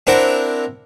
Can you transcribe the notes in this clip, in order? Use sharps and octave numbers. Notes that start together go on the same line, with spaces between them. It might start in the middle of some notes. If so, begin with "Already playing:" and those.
C4 D4 E4 A#4 F#5